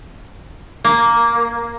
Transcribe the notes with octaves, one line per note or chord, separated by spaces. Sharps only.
A#3